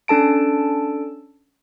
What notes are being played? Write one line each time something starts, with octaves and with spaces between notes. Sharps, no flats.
C#4 D4 A4 A5 D7